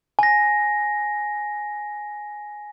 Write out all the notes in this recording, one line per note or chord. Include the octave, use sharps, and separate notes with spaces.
G#5 A#6